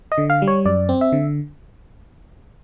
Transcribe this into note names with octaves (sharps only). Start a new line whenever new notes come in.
D#5
D3
F5
G3
C#5
F#2 D5
C4
E5
D3